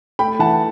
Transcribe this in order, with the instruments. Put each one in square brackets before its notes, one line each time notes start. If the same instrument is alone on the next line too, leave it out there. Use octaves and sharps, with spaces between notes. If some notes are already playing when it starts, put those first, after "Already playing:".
[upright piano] A3 G5 B5
E3 F#5 A5